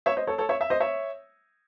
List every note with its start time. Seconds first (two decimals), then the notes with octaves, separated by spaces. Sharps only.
0.06 C#5 E5
0.16 C5 D#5
0.27 A4 C#5
0.38 A4 C#5
0.49 C#5 E5
0.61 E5
0.70 C5 D#5
0.80 C#5 E5